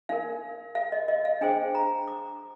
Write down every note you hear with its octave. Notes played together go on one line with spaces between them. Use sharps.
D#4 A#4 F5
F5
D#5
D#5
F5
D4 G#4 C5 G5
A#5
D6